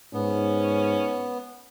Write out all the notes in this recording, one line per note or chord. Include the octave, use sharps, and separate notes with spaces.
G#2 B3 C#4